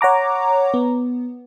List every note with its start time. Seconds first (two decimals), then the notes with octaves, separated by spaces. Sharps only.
0.01 C#5 F#5 A#5 D6
0.74 B3